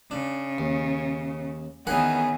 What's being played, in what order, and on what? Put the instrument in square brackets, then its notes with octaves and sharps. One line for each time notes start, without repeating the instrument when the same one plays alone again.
[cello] C#3 [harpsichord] D4
[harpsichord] D#2
[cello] D#3 E3 [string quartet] B3 C#4 G#4 [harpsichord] A#4 F#5 G#5